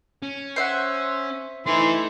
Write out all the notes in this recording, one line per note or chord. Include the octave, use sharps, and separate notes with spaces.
C#4
C5 E5 F#5
E3 A3 D#4 E4 C6